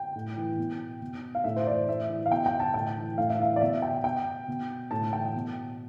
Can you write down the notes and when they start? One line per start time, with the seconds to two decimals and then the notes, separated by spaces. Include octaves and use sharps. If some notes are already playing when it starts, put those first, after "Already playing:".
Already playing: G5
0.15 A2
0.37 E3
0.58 B2
1.01 B2
1.35 F5
1.44 A2 E5
1.56 C5
1.66 E3 D5
1.88 A2 E5
2.09 E3
2.26 F5
2.31 B2 G5
2.46 G5
2.60 A5
2.74 A2 G5
2.97 E3
3.18 A2 F5
3.30 E5
3.39 E3 F5
3.56 D5
3.61 B2 E5
3.82 G5
4.04 B2 G5
4.48 B2
4.91 A2 A5
5.13 E3 G5
5.35 B2